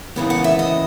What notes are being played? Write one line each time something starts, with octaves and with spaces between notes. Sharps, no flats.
D#2 C#3 E3 B3
F#5
E5
D#5